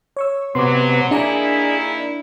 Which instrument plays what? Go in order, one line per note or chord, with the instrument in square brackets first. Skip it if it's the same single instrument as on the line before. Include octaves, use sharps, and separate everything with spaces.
[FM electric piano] C#5 C#6 E6
[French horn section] G#2 F#3 [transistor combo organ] C3 B3 [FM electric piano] C6 D6
[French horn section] D#3 A#3 E4 [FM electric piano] D4 D5 A#5 [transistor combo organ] G#4